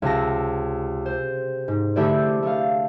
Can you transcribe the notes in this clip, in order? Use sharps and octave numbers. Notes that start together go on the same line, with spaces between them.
C#2 C3 A5 A#6
C5
G#2
D3 A3 E4 G4 C5 D5
A3 F5